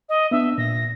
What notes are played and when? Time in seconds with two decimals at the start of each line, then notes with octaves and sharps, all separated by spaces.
0.09 D#5
0.31 B3 D4 E5
0.58 A#2 A#6